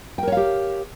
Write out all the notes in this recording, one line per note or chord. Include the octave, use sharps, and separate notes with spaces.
G4 A#4 C#5 F5 G5